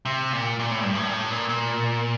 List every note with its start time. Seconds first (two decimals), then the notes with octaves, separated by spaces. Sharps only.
0.05 C3
0.33 A#2
0.59 A#2
0.71 A2
0.83 G2
0.95 A2
1.07 A#2
1.13 A2
1.31 A#2
1.49 A#2